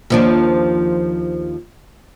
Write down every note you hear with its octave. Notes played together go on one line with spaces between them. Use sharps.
D#2 F3 D4